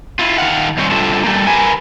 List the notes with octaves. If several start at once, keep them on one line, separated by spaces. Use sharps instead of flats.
E4 F4
D#3 F5 F#5
G#2 G3 C4 C5 C#5
D3 G3 C4 F4 A4 E5
G3 A3 A#3
A#4 B4 G#5